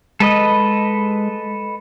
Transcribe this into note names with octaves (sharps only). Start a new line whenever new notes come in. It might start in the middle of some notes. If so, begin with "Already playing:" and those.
G#3 A4 B4 D#5